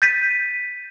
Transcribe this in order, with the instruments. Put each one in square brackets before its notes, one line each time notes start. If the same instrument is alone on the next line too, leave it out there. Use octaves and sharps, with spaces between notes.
[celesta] G6 A6 B6 D#7